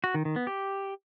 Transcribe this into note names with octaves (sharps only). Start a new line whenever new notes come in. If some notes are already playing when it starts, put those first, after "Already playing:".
F#4
D#3
D#3
B3
G4